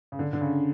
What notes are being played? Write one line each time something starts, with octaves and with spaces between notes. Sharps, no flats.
C#3
D3
D3
C#3